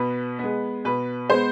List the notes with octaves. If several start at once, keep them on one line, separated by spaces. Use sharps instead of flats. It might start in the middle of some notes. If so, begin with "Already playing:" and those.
Already playing: B2 B4
G#3 B3
B2 B4
G#3 B3 C5